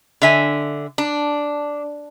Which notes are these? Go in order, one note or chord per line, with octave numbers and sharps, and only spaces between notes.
D3 E5 G#5
D4